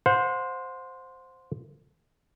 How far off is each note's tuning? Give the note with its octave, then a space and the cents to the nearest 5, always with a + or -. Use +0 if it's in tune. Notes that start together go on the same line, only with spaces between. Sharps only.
C5 +0 F#5 -40